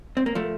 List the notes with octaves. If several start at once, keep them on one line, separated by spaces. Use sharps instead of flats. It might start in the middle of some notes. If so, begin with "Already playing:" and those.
C4
A#3
F3 A3